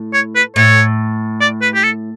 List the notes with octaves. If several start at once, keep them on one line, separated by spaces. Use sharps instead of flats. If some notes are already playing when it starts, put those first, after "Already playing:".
Already playing: A2
C#5
B4
A2 C#5
D5
B4
G4
A4